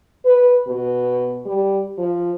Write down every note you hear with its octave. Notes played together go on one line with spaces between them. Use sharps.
B4
B2
G3
F3